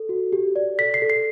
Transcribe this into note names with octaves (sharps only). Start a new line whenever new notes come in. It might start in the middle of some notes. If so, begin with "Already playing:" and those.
Already playing: A4
F#4
G4
D5
A4 B6
C7
A4
C7